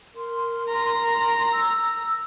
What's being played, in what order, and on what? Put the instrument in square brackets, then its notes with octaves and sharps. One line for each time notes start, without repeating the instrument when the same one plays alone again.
[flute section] A#4 C6
[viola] A#5
[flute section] E6